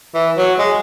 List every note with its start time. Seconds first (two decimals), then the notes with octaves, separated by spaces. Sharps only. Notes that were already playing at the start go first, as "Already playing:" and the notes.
0.14 E3
0.37 F#3
0.59 G#3